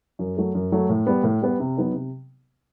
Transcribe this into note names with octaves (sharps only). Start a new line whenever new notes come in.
F#2
F#3 A3
F#2
F#3 A3
A2
G3 B3
A2
G3 B3
C3
F#3 B3 D#4
C3